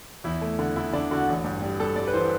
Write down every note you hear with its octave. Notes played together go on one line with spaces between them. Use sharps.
E2 E4
A3
D3
D3 E4
D3 D4
D3 F#4
A1
G2
G3
G3 A4
G3 D5
B4
E3 C5